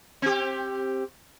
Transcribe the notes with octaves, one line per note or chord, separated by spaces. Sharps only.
C4 G4